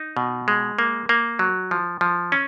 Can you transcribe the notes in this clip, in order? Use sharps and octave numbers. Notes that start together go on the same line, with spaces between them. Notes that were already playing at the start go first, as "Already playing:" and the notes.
Already playing: D#4
B2
G#3
A#3
A#3
F#3
F3
F3
C#4